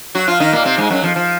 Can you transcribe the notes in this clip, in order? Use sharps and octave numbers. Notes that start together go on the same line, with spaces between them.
F#3 F#4
F3 F4
D#3 D#4
A#2 A#3
C3 C4
G#2 G#3
F#2 F#3
F2 F3
F3